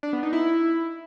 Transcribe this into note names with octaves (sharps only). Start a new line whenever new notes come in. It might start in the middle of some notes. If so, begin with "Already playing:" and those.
D4
B3
D#4
E4